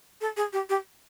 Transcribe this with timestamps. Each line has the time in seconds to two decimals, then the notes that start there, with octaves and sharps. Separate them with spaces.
0.21 A4
0.37 G#4
0.53 G4
0.69 G4